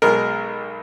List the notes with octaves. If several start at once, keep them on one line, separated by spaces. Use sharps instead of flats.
B1 B2 G#3 A#4